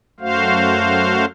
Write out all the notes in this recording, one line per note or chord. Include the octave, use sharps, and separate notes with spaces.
F#2 A3 F#4 C5 F5